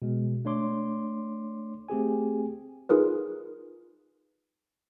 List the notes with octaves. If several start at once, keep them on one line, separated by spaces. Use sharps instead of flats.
B2 G#3
A3 D4 C#5 C6 D6
A3 C4 G4 G#4 G#5
D#4 F4 G#4 A#4 B4